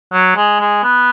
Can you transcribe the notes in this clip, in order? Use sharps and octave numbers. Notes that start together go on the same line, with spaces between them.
F#3
G#3
G#3
B3